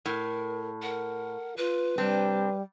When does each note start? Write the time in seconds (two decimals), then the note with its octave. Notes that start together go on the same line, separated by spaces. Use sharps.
0.06 A2 A#4
0.82 A#4 F#5
1.57 F4 B4
1.98 C3 G3 C4 D4